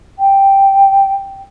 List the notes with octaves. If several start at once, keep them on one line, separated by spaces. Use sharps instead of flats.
G5